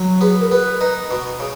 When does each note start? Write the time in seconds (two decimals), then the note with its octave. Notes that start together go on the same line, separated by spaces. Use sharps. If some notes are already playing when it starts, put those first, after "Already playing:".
Already playing: F#3
0.21 B3 G#4
0.41 A#4
0.51 B3 B4
0.81 D#4
1.11 B2
1.40 C#3